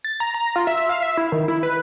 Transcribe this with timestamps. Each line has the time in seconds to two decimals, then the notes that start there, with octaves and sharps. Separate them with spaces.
0.04 A6
0.20 A#5
0.34 A#5
0.56 F4
0.67 E5
0.89 F5
1.02 E5
1.17 E4
1.32 D#3
1.48 E4
1.63 B4